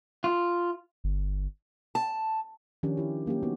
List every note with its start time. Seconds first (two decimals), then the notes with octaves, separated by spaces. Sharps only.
0.24 F4
1.04 G1
1.95 A5
2.83 D#3 F3 C#4 D4 G4
2.97 E4 G4
3.26 F#3 A#3 C#4 G4
3.43 A#3 B3 D#4 F#4